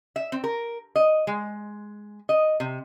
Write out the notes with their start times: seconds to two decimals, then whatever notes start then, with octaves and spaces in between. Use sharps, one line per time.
0.16 E5
0.32 C4
0.44 A#4
0.96 D#5
1.27 G#3
2.29 D#5
2.60 C3